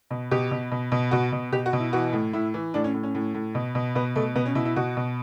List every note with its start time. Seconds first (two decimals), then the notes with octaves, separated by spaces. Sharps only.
0.11 B2
0.31 B2 G4
0.51 B2
0.71 B2
0.92 B2
1.11 B2 F#4
1.32 B2
1.52 B2 G4
1.66 F#4
1.73 B2
1.79 E4
1.93 E3 F#4
2.13 A2
2.33 A2 E4
2.54 E3
2.74 A2 D4
2.84 C#4
2.94 A2
3.03 C#4
3.15 A2
3.34 A2
3.55 B2
3.75 B2
3.95 B2 B3
4.15 B2 A3
4.35 B2 B3
4.46 C#4
4.55 B2 E4
4.65 E4
4.76 B2 F#4
4.97 B2